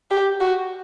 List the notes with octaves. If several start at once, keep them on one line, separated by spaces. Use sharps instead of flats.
G4
F#4